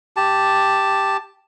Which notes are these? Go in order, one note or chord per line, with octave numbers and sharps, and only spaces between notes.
G4 A5